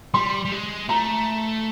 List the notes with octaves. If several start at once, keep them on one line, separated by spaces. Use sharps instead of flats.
G3 C6
G3
G#3
A3 A#5